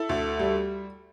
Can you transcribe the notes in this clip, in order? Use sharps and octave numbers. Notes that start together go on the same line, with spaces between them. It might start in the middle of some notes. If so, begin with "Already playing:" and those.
Already playing: E4 A4
D2
G3